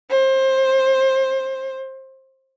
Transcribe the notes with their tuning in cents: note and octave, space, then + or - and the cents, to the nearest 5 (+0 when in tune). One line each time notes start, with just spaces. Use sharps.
C5 +20